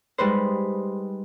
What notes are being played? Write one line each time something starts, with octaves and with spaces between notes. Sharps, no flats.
G3 G#3 D#4 B4 C5